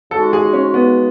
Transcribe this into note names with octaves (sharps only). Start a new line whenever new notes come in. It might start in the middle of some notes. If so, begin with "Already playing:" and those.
C#3 G#3 D#4 F#4 A4
G#4
C#4
B3